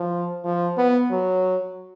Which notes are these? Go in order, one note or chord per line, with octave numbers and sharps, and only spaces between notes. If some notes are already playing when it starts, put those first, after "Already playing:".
Already playing: F3
F3
B3
F#3